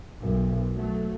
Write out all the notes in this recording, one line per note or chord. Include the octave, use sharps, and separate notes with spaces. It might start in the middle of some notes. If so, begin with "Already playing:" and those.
B1 F#2
F#3 A3